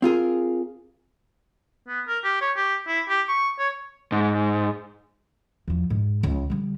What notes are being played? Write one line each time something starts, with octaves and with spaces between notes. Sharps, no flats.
C4 F4 G#4 A#4
B3
A#4
G4
C#5
G4
E4
G4
C#6
C#5
G#2
E2 F3
G#2
C#2
D3 G3